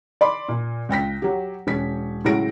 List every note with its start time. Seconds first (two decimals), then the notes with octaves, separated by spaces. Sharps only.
0.21 D5 B5 C6 D6
0.48 A#2
0.89 C#2 G5 A#6 B6
1.22 F#3 G4
1.67 E1 C#4 B6
2.24 A2 C#3 F#3 G#3 A#6 D7